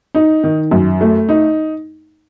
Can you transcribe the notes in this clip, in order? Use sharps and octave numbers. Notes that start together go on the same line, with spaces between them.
D#4
D#3
F#2
A3
D#4